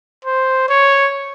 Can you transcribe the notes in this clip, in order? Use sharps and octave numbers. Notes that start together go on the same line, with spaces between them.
C5
C#5